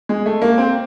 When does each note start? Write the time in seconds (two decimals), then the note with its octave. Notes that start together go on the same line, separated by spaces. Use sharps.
0.09 G#3
0.26 A3
0.42 A#3
0.58 C4